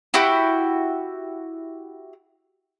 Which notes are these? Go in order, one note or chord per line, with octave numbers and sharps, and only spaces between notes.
E4 F#4 G4